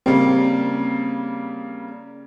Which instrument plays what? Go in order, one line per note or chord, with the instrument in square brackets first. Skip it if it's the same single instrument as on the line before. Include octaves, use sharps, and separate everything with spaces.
[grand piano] C#3 G3 A#3 [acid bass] C4